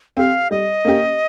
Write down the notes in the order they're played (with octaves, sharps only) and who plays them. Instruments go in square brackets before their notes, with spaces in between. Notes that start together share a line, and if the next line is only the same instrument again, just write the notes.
[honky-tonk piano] C4 G4 [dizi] F5
[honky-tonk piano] G3 [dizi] D#5
[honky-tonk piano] A#3 C#4 G4